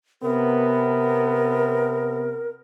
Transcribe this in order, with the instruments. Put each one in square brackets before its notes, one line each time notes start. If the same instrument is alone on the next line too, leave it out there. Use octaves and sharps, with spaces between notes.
[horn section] C3 B3 [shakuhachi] A#4